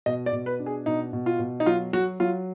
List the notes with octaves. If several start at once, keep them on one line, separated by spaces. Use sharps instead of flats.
B2 D#5
D5
B2
B4
D4
G#4
B2 D#4
B2
F4
B2
D#4
F#3 F4
F#3 F#4
F#3 F4